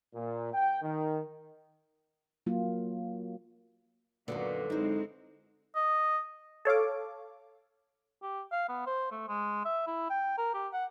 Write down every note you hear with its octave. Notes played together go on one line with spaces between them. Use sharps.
A#2
G5
D#3
F#3 A#3 F4
F#2 A#2 D3 D#3 B3 F#4 B4
G#3 C4 D#4 E4 C5
D#5
A4 C#5 F5 D6
G4
F5
B3
C5
A3
G#3
E5
E4
G5
A#4
G4
F#5